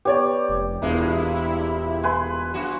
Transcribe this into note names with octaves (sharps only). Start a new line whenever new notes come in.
B3 G4 C#5 D5
F1
E1 G2 A#2 G#3 E4
B4 G#5 C6
F#2 F#4